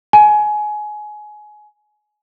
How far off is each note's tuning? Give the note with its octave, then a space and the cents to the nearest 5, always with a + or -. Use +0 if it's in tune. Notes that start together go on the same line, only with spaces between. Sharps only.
G#5 +20